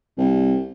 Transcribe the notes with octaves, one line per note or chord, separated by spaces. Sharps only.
C2